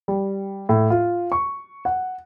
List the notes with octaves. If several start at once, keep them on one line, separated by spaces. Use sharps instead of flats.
G3
A2
F4
C#6
F#5